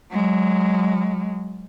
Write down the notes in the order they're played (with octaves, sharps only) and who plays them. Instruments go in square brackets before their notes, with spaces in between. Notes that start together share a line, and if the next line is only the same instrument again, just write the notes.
[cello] F#3 G#3